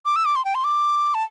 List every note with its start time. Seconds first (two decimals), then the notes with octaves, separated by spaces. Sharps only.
0.06 D6
0.16 E6
0.25 D6
0.36 C6
0.45 G5
0.55 C6
0.64 D6
1.14 A5